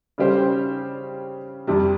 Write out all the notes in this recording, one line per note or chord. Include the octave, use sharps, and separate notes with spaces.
C#3 G3 C#4 G4 C5
F2 C3 G3